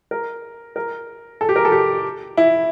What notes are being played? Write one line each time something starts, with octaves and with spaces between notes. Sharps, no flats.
A#4
A#4
A4
G4
A#4
A4
G4
E4